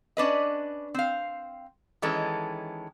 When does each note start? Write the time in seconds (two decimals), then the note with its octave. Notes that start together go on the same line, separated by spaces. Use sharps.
0.17 C#4 D4 B4 D#5
0.94 C4 F5
2.02 D#3 E3 G#3 C#4 A4